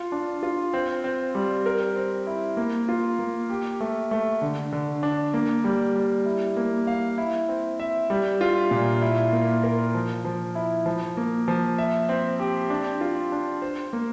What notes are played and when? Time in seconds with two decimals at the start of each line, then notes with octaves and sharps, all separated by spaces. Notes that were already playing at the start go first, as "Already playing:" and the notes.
Already playing: F4
0.12 D4
0.43 F4
0.74 C4
1.04 C4
1.35 G3
1.66 A#4
1.96 C4
2.27 E4
2.57 A#3
2.89 F4
3.19 A#3
3.50 G4
3.81 A3
4.11 A3
4.42 D3
4.73 D3
5.03 D4
5.34 A#3
5.64 G3
5.95 G3
6.26 E4
6.57 A#3
6.87 F5
7.18 E4
7.49 C4
7.80 E5
8.10 G3
8.41 F4
8.71 A#2
9.02 E4
9.33 A#3
9.63 A#4
9.94 F3
10.25 F3
10.55 E4
10.86 F3
11.17 A#3
11.48 F3
11.78 E5
12.09 C4
12.39 G4
12.70 D4
13.01 F4
13.32 D4
13.62 C5
13.93 A#3